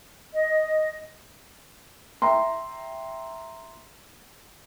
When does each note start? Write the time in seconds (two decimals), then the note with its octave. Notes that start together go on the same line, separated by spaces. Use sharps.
0.33 D#5
2.22 E5 G5 A#5 C6